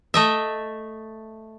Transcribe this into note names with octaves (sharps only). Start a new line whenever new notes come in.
A3 D#5 E5